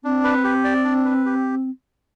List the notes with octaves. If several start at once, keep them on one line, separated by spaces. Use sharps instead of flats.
C4 D4
B4
G4
D5
D4
B4
G4